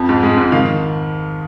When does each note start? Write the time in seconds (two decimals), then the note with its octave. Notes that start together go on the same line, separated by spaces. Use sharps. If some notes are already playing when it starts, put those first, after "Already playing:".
Already playing: F2 F3
0.09 G#2
0.23 G#3
0.37 G#2
0.52 D#3 F5